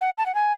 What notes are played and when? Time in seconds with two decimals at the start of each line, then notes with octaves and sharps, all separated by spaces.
0.01 F#5
0.18 A5
0.26 F#5
0.35 G#5